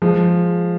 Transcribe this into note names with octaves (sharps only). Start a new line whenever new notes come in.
F3 G#3